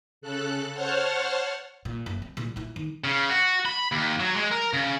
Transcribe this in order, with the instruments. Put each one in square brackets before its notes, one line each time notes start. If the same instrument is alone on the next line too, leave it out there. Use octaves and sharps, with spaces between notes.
[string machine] C#3 A4 F#6
C5 C#5 F#5 A5 F6
[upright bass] A#2
F#1
C4
A#2 E3
A#2 E4
D#3
[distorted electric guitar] C#3
F#4
B5
D#2
F#3
G#3
A#4
C#3